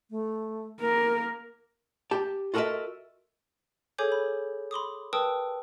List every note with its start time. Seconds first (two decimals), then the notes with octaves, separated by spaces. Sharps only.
0.10 A3
0.81 A#3 A#4
2.11 G4 A5
2.54 F4 F#4 A4 A#4 D#5 E5
3.98 G#4 A4 C#5 G#5 D6 G6
4.12 B5
4.71 B5 C6 D6 D#6
5.13 A#4 B4 G5 A5 D#6 E6